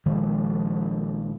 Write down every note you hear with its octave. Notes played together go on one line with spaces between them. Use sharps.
A#1 D#3 F3 G#3